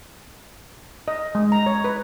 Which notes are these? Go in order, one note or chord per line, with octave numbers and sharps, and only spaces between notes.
D#5
G#3
A#5
C#5
B4